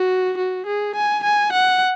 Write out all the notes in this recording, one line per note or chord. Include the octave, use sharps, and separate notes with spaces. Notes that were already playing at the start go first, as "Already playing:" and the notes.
Already playing: F#4
F#4
G#4
G#5
G#5
F#5